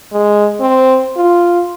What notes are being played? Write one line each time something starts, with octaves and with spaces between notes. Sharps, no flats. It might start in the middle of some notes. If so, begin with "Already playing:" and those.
G#3
C4
F4